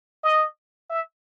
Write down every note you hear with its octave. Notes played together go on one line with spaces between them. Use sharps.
D#5
E5